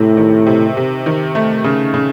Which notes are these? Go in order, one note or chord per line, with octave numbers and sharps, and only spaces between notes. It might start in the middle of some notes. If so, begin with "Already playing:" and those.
Already playing: A2 C3
D#3
C3
C3
D#3
A3
C#3
C#3